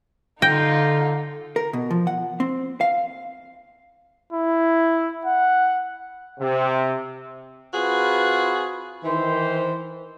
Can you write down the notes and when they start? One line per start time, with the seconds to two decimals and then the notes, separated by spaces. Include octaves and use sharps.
0.42 D3 D#4 F4 G5 G6 A#6
1.56 A#4
1.73 B2
1.91 F3
2.07 F#5
2.40 C4
2.81 F5
4.32 E4
5.25 F#5
6.40 C3
7.74 C4 F4 F#4 G#4 B4
9.04 D#3 E3 C5